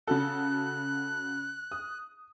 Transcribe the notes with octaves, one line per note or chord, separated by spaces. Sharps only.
C#3 F#4 A4 F#6
D#6